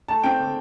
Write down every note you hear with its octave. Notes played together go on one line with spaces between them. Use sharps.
A3 A5
C4 G5
D3